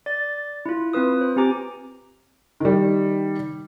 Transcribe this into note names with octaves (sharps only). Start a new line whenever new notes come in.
D5 A6
E4 F4
C4 F4 B4 D#6
C5
C4 G4 G#5 A#5 D6
D#3 G3